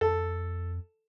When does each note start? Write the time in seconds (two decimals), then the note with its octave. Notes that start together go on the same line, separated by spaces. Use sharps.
0.01 F2 A4